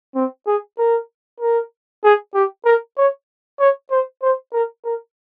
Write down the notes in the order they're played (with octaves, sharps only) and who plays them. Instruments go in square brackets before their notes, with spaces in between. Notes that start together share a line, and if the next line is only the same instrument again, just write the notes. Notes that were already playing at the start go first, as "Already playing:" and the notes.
[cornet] C4
G#4
A#4
A#4
G#4
G4
A#4
C#5
C#5
C5
C5
A#4
A#4